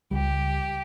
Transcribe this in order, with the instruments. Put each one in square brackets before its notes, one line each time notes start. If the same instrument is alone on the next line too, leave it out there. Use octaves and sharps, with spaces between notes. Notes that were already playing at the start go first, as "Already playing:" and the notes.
[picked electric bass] C#2 G3 [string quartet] G4